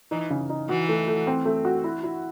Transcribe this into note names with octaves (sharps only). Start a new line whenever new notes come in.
E3 D#4
C#3
D#4
E3 F#4
A3
A3
C4
A3
F#4
E4
E4